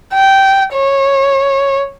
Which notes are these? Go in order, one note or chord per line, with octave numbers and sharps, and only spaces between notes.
G5
C#5